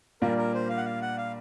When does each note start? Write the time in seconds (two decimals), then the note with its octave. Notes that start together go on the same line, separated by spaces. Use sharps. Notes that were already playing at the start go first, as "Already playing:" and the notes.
0.21 A#2 G3 A#3 D4 F4 A#4
0.38 A#4
0.54 C5
0.69 F5
0.77 F#5
0.85 F5
1.02 F#5
1.18 F5